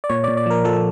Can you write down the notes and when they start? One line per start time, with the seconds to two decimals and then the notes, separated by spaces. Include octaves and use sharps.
0.04 D5
0.09 A#2 C#5
0.24 D5
0.28 A#2
0.37 D5
0.46 F3 A#4
0.65 F3 A4